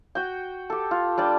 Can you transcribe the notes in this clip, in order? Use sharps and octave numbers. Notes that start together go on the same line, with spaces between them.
F#4 G5
G4 A4
F4
G3 D4 D5 G5